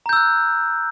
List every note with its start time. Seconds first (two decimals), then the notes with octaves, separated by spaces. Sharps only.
0.06 A#5
0.09 G6
0.13 E6
0.16 F#6